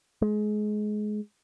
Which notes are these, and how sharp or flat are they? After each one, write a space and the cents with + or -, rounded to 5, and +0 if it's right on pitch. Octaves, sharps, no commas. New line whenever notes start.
G#3 +25